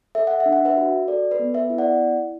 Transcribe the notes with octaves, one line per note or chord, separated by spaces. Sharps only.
A4 E5
F#5
E5
D4
F#5
B4 E5
F#4
A4 D5
B4
B3
B4 E5
E4
D5 F#5